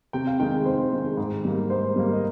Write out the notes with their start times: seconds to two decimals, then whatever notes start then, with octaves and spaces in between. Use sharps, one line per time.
0.13 C3 G5
0.27 F5
0.40 D#3 G#3 G5
0.65 C3 C5
0.92 D#3 G#3
1.17 G#2
1.45 G3 A#3
1.70 G#2 C5
1.96 G3 A#3
2.13 D#5